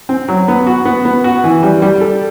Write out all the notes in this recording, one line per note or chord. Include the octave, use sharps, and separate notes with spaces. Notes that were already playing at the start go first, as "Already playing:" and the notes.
C4
F#3
B3
F#4
B3
B3
F#4
E3
G3
G3
A4